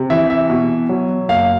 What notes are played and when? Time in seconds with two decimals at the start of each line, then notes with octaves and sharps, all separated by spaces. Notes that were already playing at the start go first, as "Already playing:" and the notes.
Already playing: C3
0.10 E3 E5
0.30 E5
0.50 B2
0.89 F#3
1.29 F#1 F5